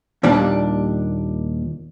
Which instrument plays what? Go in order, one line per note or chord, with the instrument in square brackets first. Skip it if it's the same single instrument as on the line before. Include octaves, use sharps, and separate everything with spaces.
[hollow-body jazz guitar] D#2 A#2 G3 D4